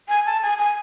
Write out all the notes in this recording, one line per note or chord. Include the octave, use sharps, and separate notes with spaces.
G#5
A5
G#5
G#5